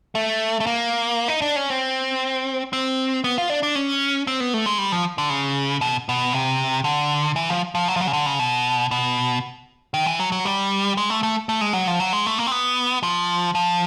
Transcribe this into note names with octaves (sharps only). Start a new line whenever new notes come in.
A3
A3
A#3
D#4
D4
C#4
C4
C4
B3
F4
D4
D4
C#4
C4
B3
A3
G#3
G3
F3
D3
C#3
B2
B2
C3
D3
E3
F3
F3
F#3
F3
F#3
C#3
D3
C#3
B2
B2
D#3
E3
F#3
F#3
G3
G#3
A3
A3
A3
G#3
F#3
F3
F#3
G#3
A3
A#3
C4
B3
F3
F3